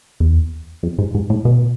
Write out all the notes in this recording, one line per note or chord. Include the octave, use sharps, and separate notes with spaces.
E2
F2
G#2
G#2
A2
B2